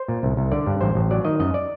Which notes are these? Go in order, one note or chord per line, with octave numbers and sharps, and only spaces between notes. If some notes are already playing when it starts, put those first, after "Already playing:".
Already playing: C5
A#2
C2
C2
D3 D5
G2
A1 C5
A1
F#3 D5
D#3 D#5
F#2 D#5
D5